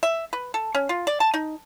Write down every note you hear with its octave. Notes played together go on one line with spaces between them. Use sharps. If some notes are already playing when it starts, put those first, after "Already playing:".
E5
B4
A4
C#4
F4
D5
A5
D#4